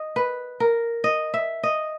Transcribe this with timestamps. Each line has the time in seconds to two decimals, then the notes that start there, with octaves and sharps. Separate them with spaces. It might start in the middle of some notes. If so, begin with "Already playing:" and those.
Already playing: D#5
0.16 B4
0.60 A#4
1.04 D#5
1.34 E5
1.63 D#5